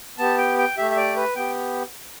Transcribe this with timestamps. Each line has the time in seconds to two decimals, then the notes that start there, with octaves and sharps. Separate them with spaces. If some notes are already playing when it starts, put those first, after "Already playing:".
0.18 B3 G4 A5
0.38 G5
0.58 G5
0.77 A3 G4 E5
0.91 E5
0.96 D5
1.16 B4
1.36 B3 G4 G5